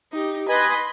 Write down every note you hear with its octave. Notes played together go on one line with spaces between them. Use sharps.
D#4 G4
B4 D#5 G#5 B5 C6